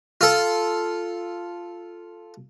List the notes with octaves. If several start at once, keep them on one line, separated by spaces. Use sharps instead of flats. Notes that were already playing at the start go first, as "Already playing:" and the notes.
F4 A4